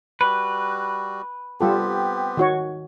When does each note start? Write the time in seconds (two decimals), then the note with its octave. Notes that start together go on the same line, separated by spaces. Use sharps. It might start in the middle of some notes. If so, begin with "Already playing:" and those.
0.21 G3 F#4 B4
1.61 G3 B3 C4 F4 G4 A4
2.37 D#3 F#4 C#5